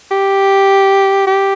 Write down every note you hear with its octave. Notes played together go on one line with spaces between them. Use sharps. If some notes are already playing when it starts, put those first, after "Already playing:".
G4
G4